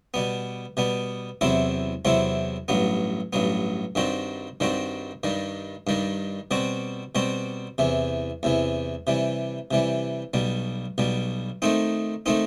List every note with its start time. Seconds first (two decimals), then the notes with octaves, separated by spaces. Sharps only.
0.14 B2 G3 B3
0.77 B2 G3 B3
1.41 E2 C3 F#3 C4 E4
2.05 E2 C3 F#3 C4 E4
2.68 A1 G2 F#3 B3
3.33 A1 G2 F#3 B3
3.95 G2 D#3 G3 C4 F#4
4.60 G2 D#3 G3 C4 F#4
5.23 G2 D#3 G3
5.87 G2 D#3 G3
6.51 B2 G3 C4 F#4
7.15 B2 G3 C4 F#4
7.78 E2 C3 E3
8.43 E2 C3 E3
9.07 C3 E3 G3
9.71 C3 E3 G3
10.34 B1 B2 G3
10.98 B1 B2 G3
11.62 D#3 A3 C4 D#4
12.26 D#3 A3 C4 D#4